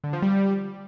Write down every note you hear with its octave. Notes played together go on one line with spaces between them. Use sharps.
D3
F3
G3